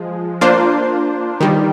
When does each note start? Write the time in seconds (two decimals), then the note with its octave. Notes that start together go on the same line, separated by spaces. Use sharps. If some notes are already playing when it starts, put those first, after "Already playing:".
Already playing: F3 G#3
0.41 A#3 D4 F4 C5
1.40 D#3 G3